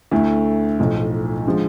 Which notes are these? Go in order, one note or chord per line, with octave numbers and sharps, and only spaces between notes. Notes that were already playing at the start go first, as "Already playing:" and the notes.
D2 D3 A3 E4
B1 A2 F3
D3 F3 G#3